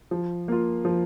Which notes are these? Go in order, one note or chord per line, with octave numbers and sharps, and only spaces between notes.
F3
A#3 F4
F3